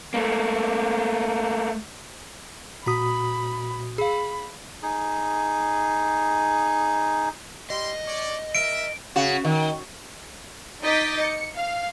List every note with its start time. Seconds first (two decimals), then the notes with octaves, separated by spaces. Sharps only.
0.14 A3 A#3
2.86 A#2 F#4 A#5 B5 D#6 B6
3.98 G#4 F5 B5
4.82 D#4 G#4
7.70 G3 D#5 C6
8.07 C#5 D5
8.55 A#4 E5 D7
9.16 C#3 F#4
9.45 D#3
10.82 D#4 D#5 D6 G6 A6 B6
11.21 C#7
11.55 F5